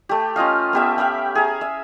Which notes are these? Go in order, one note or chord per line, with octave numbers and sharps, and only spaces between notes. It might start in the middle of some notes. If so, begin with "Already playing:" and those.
A3 G4
C#4 F4 D#5 F5
B3 G4 E5
E5 F5 G5 B5
G#4 A#5
E5